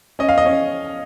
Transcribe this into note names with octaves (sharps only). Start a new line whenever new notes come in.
C#4 D#5
F5
D#5
C#4